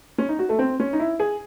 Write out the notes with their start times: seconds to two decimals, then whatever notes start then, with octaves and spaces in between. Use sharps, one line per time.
0.18 C#4
0.29 D#4
0.39 F#4
0.49 A3
0.59 C4
0.80 C#4
0.93 D#4
0.99 E4
1.20 G#4